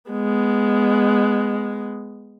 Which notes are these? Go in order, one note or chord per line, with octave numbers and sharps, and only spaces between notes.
G#3 B3